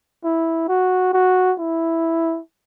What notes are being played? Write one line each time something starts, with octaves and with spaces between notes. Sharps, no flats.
E4
F#4
F#4
E4